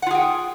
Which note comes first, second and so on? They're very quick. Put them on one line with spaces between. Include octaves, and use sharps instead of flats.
F#5 F4 G#4 G5